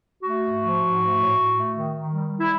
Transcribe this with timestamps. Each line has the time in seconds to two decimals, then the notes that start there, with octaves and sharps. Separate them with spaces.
0.23 A3 F#4
0.42 G#2
0.62 F3
0.80 G#2
0.98 A3
1.18 A2
1.37 A2
1.56 A3
1.74 D#3
1.93 D#3
2.12 G3
2.31 G3
2.39 E4